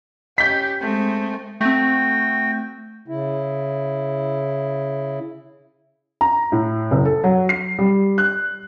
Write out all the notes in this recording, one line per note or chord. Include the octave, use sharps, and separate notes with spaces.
C#4 G4 G6 B6
G#3 A3 C4
A3 C4 F#4 G5
C#3 E4
A#5
A2
F#1
A4
F#3
C7
G3
F#6